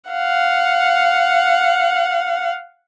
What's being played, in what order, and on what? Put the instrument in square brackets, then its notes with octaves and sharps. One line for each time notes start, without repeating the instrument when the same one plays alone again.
[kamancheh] F5 F#5